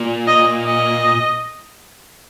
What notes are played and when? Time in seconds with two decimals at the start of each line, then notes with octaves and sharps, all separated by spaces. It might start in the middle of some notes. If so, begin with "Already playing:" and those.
Already playing: A#2
0.27 D#5
0.66 D#5